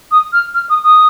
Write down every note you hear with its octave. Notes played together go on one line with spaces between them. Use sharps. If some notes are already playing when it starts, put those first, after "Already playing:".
D#6
F6
F6
D#6
D#6